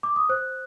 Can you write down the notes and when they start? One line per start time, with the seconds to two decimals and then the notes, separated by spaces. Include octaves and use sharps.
0.03 D6
0.16 D#6
0.29 C5 F#6